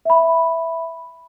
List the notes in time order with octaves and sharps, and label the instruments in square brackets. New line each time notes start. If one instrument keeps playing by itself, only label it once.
[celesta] E5 B5